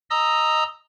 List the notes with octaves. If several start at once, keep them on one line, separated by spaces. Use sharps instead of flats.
D#5 A#5 D#6 E6